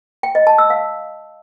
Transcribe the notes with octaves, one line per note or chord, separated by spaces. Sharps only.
G5
D#5
A5
E6
F5